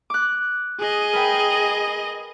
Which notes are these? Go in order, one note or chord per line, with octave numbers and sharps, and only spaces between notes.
D6 F#6
G#4 D#5
A#4 B4 G5